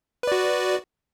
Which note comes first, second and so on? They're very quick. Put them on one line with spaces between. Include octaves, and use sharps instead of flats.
B4 D5 F#4